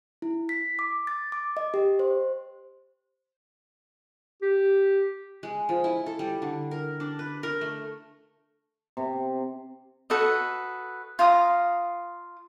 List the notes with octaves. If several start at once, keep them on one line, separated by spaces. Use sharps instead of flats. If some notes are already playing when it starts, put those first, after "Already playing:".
E4
B6
D6
A6
D6
D#5
G4
C5
G4
G#3
F3
E4
A4
G3
D3
A#4
D4
B4
A#4
A3
C3
F#4 A4 B4 D#5
F4 F5 A#5 D#6